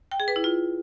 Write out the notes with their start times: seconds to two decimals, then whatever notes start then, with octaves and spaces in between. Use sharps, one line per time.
0.11 G5
0.20 G#4
0.28 B4
0.36 E4
0.44 F4